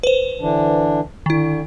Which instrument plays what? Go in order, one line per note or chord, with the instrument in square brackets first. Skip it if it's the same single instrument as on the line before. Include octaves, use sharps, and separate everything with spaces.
[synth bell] B4 C5
[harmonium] D3 E3 D4
[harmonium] D3 [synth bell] D#3 E4